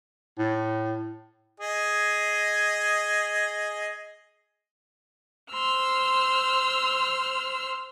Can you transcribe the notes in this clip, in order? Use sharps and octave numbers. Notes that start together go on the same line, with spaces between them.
A2
G#4 D#5
C5 C6 E6 F6